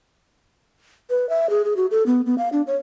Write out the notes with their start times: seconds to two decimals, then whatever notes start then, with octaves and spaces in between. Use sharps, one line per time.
1.10 B4
1.29 E5
1.50 G#4
1.65 G#4
1.77 F#4
1.91 A4
2.06 B3
2.26 B3
2.38 F5
2.52 D4
2.67 C#5